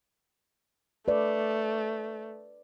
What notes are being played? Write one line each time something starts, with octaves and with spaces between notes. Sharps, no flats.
A3 B4 D5